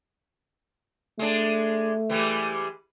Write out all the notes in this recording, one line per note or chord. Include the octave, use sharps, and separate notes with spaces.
G#3 A3 D4
E3 G3 G#3